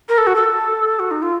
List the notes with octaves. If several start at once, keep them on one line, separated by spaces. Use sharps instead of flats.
A#4
A4
F#4
A4
F#4
D#4
F4